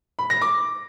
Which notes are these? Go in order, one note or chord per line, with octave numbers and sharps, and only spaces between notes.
B5
A#6
D6